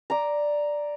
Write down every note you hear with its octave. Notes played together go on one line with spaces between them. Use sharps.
D5 A#5